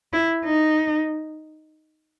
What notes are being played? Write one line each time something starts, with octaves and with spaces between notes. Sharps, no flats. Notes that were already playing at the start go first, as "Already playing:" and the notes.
E4
D#4